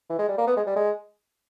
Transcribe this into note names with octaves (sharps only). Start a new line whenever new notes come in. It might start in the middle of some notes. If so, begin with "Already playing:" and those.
E3
G#3
G3
A#3
B3
G#3
G3
G#3